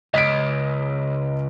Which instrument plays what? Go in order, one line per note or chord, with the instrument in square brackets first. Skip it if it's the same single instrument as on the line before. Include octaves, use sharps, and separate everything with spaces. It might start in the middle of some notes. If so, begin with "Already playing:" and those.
[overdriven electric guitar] C#2 [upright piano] D#5 B6 D7